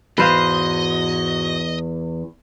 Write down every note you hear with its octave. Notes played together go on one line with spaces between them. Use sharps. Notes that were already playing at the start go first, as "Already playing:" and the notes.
E2 G#2 F#4 B4 C5 D#5 F5